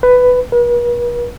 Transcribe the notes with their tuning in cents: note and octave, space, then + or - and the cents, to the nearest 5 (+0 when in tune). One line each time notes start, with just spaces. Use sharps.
B4 +10
B4 -45